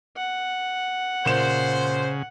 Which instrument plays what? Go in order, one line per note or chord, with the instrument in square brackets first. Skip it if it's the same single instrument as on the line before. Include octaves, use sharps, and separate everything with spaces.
[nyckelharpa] F#5
[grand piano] A#2 E7 [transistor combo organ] C#3 [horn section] C5